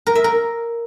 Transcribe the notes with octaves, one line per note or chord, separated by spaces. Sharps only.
A#4
E5
A#4